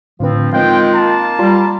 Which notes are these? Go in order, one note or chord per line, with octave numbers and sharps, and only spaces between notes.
A2 D3 F3 C4 B4
D#3 G#3 C4 F4 F5 G5
A#3 A5
G3 F4 A#5 C6